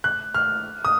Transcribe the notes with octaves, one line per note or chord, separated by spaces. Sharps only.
F#6
F6
D#6